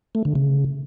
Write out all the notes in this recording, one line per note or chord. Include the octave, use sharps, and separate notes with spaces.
A3
D3
C#3